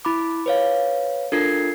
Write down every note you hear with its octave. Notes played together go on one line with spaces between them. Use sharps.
E4 B5 D6
B4 C#5 F5
D4 F4 A4 A#4 G#6 C7